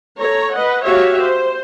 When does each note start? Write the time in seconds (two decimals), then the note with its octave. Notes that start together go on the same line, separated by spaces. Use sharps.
0.19 A4 C#5 A#5
0.54 B4 D#5 F#5
0.84 F#4 G4 C#5 E5 F5
1.22 C5